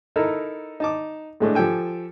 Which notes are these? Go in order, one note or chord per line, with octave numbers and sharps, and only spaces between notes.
D#4 E4 A4 A#4
D#4 A5 D6
A2 G#3 A3 D4
F3 G4 A4 G5 G#5